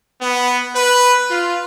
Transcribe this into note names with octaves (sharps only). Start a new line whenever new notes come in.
B3
B4
F4